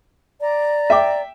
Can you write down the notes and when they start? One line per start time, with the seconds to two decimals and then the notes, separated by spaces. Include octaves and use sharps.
0.41 D5 A#5
0.90 E5 G5 D6